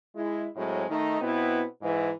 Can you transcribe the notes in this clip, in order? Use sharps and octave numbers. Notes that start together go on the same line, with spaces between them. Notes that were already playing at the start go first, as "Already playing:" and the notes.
G#3 E4
A2 F#3 G#3 C4
D#3 A3 D#4
B2 B3 C4 E4
G#2 E3